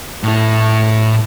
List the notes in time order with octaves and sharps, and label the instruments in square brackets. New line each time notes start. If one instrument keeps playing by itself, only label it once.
[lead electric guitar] A2 E4